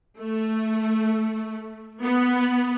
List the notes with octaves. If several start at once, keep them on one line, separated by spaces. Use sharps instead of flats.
A3
B3